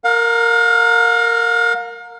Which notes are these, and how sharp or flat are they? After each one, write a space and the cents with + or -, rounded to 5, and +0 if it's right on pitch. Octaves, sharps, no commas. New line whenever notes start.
A#4 -10 F5 +40